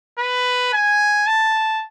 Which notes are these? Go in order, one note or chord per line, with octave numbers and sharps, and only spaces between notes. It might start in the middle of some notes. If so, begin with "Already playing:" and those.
B4
G#5
A5